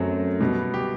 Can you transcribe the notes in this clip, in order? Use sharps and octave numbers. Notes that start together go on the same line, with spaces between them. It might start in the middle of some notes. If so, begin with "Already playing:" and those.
Already playing: F#2 F#3 A3 C4
B2 G3 B3
G4